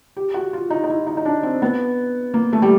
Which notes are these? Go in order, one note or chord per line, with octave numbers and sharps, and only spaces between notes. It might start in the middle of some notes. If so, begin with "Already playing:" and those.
G4
F#4
F4
D#4
D#4
E4
D#4
D#4
D4
C4
B3
A#3
A3
G3